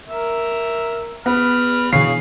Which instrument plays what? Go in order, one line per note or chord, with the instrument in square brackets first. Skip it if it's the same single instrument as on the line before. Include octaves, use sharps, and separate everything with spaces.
[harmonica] A#4 E5
[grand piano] B3 [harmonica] B5 F6
[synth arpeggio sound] B2 D3 E3 [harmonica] G#4 C#5 F5 [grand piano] C7